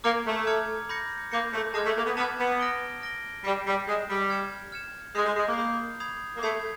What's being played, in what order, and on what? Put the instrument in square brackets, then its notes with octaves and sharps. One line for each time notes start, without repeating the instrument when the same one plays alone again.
[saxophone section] A#3 [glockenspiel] A#5 D6 F6 G#6 C#7
[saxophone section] A3
[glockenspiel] A#5 D6 F6 G#6 C#7
B5 D6 G6 A#6 C#7
[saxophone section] A#3 [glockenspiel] B5 D6 G6 A#6 C#7
[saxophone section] A3
[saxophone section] G#3 [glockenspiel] A5 D6 F6 G#6
[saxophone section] A3
A#3
B3
[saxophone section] B3 [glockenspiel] A5 D6 F6 G#6
[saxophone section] B3
[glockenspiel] F6 A#6 D7 G7
F6 A#6 D7 G7
[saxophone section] G3 [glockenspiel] G6 C7 E7
[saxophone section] G3
[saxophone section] G#3 [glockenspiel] G6 C7 E7
[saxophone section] G3
[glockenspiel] F6 G#6 C#7 E7
F6 G#6 C#7 E7
[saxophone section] G#3 [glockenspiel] B5 D#6 G6 C7
[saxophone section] G#3
G#3
A#3
[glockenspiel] B5 D#6 G6 C7
B5 D#6 G#6 C7 F7
[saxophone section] A#3
[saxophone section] A3 [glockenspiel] B5 D#6 G#6 C7 F7